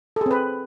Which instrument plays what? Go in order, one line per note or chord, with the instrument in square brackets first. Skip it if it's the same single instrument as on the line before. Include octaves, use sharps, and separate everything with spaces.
[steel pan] A4
G#4
C4
B4